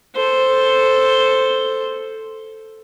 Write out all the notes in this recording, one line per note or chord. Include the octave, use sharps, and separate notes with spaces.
A4 C5